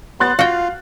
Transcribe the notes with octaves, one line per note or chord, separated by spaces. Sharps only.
B3 C6 F#6 A6
F4 F#4 F5 G5